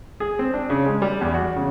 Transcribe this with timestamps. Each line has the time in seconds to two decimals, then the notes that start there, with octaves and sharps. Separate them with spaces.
0.20 G#4
0.39 C4
0.54 D4
0.70 C#3
0.86 G#3
1.02 G3
1.21 E2
1.34 F#4
1.56 C#3